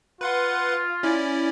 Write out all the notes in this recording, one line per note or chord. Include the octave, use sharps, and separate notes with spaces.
F4 B4 F#5 C6
C#4 E4 D5